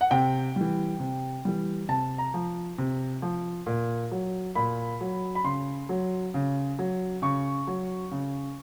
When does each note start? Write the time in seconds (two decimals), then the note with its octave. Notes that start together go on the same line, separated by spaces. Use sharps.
0.01 F#5
0.11 C3 G5
0.56 E3 G3
1.00 C3
1.45 E3 G3
1.89 C3 A5
2.18 A#5
2.34 F3
2.78 C3
3.22 F3
3.66 A#2
4.11 F#3
4.55 A#2 B5
5.01 F#3
5.35 B5
5.44 C#3 C6
5.89 F#3
6.34 C#3
6.79 F#3
7.22 C#3 C#6
7.67 F#3
8.11 C#3